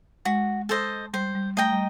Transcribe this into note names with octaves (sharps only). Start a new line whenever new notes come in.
G#3 F#4
A4 C5 D#5
G3 C5
G3
A3 D#5 G5 A#5
G3